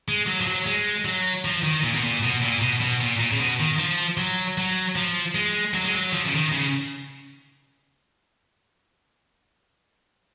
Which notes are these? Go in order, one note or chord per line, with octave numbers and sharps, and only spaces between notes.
G#3
F#3
F3
F#3
G#3
F#3
F3
D#3
A#2
B2
A#2
B2
A#2
B2
B2
A#2
A#2
C#3
B2
D#3
F3
F#3
F#3
F3
G#3
F#3
G#3
F#3
F3
C#3
D#3
C#3